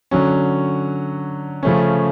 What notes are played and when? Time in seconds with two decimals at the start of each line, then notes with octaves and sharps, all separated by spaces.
0.11 D3 F#3 C#4
1.63 C#3 F3 A3 C#4